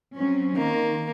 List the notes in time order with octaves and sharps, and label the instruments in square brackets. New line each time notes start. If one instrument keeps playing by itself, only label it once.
[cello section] F#3 C4 C#4
[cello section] D#3 [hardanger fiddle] A#3